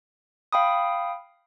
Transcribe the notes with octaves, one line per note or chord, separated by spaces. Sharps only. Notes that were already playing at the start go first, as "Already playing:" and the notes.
F5 G5 B5 D#6